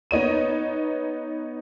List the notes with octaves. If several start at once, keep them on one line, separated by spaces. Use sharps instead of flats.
B3 D#4 C#5 D#7